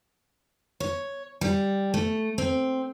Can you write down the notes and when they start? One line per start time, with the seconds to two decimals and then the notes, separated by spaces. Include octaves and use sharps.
0.80 C#5
1.41 G3
1.94 A3
2.38 C4